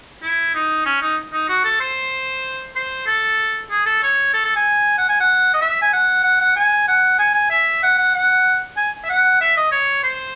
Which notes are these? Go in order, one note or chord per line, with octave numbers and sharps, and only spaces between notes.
E4
D#4
C#4
D#4
D#4
F#4
A4
C5
C5
A4
G#4
A4
C#5
A4
A4
G#5
F#5
G#5
F#5
D#5
E5
G#5
F#5
F#5
F#5
G#5
F#5
G#5
G#5
E5
F#5
F#5
F#5
G#5
E5
F#5
E5
D#5
C#5
C5